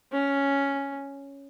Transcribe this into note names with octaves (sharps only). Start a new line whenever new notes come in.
C#4